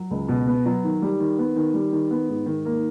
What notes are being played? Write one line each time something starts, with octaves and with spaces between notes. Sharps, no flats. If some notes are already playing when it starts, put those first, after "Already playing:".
Already playing: F#3
C#2
B2
B3
F#3
D#3
G3
D#3
B3
D#3
G3
D#3
B3
G#2
D#3
A#3